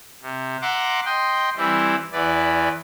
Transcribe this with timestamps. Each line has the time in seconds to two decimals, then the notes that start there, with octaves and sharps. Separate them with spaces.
0.22 C3
0.62 E5 F#5 A#5 C6 D6
1.06 D#5 G5 C6
1.57 E3 G3 C4 E4
2.12 E2 E3 B4 D5